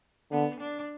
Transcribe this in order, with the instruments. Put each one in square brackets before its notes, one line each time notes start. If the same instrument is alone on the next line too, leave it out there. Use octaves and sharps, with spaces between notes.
[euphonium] D3 [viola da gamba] B3
[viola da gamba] D4